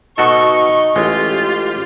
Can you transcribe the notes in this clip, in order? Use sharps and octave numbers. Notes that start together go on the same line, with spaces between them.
B2 D#4 F#4 A4 C#6
A1 G#3 F4 G4